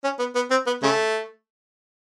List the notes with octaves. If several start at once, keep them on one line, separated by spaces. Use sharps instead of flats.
C#4
B3
B3
C4
B3
C#3 A3